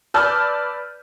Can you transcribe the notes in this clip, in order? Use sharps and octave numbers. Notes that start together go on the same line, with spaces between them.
B4 D5 A5 E6 F6 G6